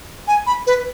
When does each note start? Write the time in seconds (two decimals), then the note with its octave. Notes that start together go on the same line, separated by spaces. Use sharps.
0.28 G#5
0.47 B5
0.67 B4